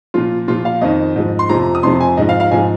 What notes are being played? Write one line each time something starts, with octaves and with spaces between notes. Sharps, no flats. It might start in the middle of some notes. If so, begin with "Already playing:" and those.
A#2 F3 F4
A#2 F3 F4
F5
F2 D#3 D#5
G#2 F3
C6
F2 C3 F3 A#5
D#6
F2 C3 F3 C6
G#5
G#2 F3 D#5
F5
F5
G#2 F3 G#5